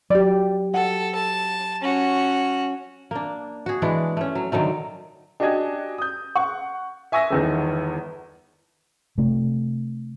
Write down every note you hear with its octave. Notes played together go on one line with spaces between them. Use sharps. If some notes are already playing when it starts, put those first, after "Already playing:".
F#3 G4 D5
A4 F#5
A5
C#4 F#4
A#3 D4
F#4 G#4
E3 G#3 D4
A3 C#4
F#3
D3 D#3 F#3 A3
D4 F#4 G4 D#5 G#5 G#6
D#6 G6
F#5 C#6
E5 G#5 C#6 E6 A#6
G1 E2 D#3
C3 A3